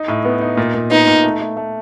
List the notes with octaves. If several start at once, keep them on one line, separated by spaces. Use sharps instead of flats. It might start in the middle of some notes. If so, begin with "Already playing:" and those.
Already playing: D#4
A2
B3
D#4
A#2
A#2
B3 D#4
A#2
A3
A3
A3